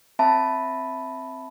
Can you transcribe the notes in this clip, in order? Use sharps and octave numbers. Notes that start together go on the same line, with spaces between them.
C4 E5 A5 B5